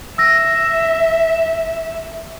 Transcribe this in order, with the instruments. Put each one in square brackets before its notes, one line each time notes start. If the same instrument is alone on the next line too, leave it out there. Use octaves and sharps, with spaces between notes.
[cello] E5 [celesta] E6 A#6